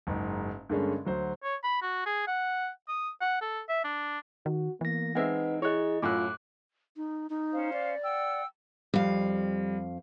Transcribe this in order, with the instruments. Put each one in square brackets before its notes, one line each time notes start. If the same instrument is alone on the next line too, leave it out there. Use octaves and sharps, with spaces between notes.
[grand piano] F#1 G#2
G2 D3 G#3 A#3 C#4
D2 F#3 C5
[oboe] C#5
B5
F#4
G#4
F#5
D#6
F#5
A4
E5
D4
[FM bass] D#3 [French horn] F#4
[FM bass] E3 [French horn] A#3 [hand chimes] B3 A#6
[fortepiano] G#3 C4 E5 [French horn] D#4 [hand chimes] B4 F#5
[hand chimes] E4 D#5 [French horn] G#4 [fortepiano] C#5 F#6
[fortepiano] F#2 A2 [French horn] F4 [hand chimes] D6 F#6
[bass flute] D#4
D#4
[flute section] C#4 C5 F5
[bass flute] D5
[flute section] F#5 G5 E6
[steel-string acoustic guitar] F2 F5 [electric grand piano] G3